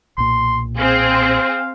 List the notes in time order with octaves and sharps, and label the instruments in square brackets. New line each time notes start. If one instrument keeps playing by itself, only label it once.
[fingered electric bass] B1 A#2 [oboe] C6
[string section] C4 G#4 C5 [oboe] F5